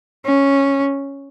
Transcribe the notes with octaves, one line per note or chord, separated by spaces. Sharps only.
C#4